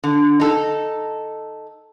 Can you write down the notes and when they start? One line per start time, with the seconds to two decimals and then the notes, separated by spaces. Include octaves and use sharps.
0.04 D3
0.40 D#4 A4